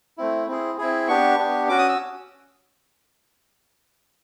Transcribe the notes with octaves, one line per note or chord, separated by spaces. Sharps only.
A3 C4 E4
C4 E4 G#4
C4 E4 G#4
B3 D4 G4 C#6
B3 D4 G4
C#4 F#4 D6
D#6
E6